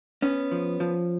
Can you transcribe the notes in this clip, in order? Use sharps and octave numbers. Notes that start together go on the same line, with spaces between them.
B3 C#4
F3
F3